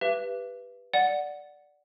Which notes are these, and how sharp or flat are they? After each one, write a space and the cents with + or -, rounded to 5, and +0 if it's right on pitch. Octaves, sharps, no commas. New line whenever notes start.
G4 +0 B4 +0 E5 +35
D5 +0 F#5 +0